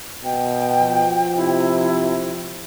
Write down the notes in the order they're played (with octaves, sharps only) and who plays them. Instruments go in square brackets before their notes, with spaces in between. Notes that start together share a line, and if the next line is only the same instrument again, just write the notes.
[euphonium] B2 [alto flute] G5
[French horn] F3
[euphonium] C3 [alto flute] E4